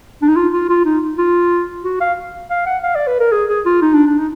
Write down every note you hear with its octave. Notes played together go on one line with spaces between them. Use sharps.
D4
D#4
F4
F4
F4
D#4
F4
F#4
F5
F5
F#5
F5
D5
B4
A#4
G#4
G#4
F4
D#4
D4
D4
D#4